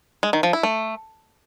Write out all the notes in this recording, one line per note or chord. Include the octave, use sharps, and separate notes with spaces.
G#3
D#3
F3
E4
A3